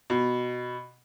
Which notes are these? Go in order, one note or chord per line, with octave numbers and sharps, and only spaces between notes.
B2